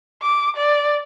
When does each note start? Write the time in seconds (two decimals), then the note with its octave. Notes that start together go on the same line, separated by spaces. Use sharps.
0.22 D6
0.57 D5